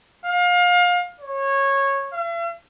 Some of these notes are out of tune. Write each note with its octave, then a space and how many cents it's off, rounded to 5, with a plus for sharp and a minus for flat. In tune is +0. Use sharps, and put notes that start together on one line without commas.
F5 +30
C#5 -15
E5 +45